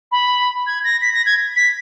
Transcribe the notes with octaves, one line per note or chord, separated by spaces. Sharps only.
B5
G#6
A#6
B6
A#6
G#6
B6